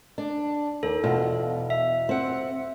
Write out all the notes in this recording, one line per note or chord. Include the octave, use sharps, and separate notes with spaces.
D4
D#2 A4
E2 B2 F4
E5
C4 F#5